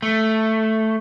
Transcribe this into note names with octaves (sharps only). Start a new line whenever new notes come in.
A3